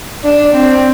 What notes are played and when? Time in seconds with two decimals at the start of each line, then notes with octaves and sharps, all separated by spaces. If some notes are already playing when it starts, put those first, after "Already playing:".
0.24 D4
0.55 C4